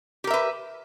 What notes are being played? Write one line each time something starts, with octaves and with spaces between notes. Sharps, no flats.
G4 A#4 B4 E5